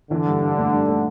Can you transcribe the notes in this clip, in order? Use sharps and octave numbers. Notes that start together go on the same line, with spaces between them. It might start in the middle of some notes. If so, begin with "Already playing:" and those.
D3 E3
G2
G2
A3
G2
A3